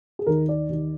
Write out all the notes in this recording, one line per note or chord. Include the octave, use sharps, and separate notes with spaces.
G#4
D#2 D#3 A#4
D5
D#2 D#3